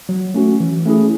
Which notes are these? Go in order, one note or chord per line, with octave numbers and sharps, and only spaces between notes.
F#3
A3 C#4 F#4
E3
A3 C#4 E4 G#4